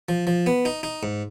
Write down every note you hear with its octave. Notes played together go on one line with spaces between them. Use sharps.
F3
F3
B3
D#4
D#4
G#2